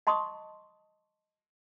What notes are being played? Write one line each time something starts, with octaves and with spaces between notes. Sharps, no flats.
D#5 A5 C6 C#6 D#6